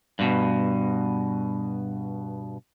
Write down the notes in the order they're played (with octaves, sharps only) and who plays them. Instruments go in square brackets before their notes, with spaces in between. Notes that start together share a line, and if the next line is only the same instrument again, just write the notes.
[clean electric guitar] G2 B2